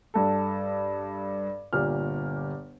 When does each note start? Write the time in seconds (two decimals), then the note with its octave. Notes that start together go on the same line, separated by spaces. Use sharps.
0.14 G2 A4
1.73 G1 A#2 G4 F6